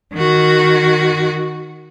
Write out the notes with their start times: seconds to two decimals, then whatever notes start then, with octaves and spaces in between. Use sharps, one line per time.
0.13 D#3 F#4